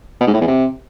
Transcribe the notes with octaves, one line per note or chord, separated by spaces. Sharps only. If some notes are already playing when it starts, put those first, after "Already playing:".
B2
G#2
A2
E2
C3